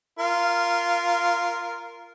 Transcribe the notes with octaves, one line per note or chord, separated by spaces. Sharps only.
F4 A#4